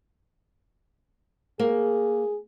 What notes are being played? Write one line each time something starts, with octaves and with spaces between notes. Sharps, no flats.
A#3 G#4